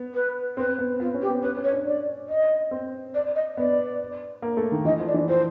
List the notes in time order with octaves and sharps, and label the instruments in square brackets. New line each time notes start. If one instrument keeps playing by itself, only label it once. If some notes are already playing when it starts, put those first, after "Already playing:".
Already playing: [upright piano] B3
[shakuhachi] B4
[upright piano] C4 [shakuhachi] B4
[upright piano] B3
[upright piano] B3 [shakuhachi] F4
[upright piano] C#4
[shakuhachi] G4
[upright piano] B3
[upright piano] C#4 [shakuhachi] B4
[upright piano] C#4
[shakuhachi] C#5
[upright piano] D4
[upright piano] D4 [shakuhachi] D5
[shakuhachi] D#5
[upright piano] C4
[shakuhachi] D5
D#5
[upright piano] B3 [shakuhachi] D5
[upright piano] A#3
A3
D#3
[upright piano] E3 [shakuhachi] D#5
[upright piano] F3
[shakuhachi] D5
[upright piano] E3
[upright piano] F3 [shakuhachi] C5